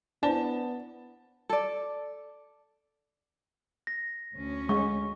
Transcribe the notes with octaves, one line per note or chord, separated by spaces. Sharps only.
B3 D4 E4 C5 D5 A5
A4 D5
A#6
D2 C#4
G#3 C#6